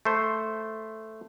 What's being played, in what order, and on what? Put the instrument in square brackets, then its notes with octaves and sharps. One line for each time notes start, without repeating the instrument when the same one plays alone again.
[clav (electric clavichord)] A3 C5